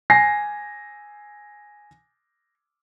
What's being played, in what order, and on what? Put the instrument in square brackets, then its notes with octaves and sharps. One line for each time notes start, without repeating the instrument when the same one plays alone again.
[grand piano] G#5 A#6 C7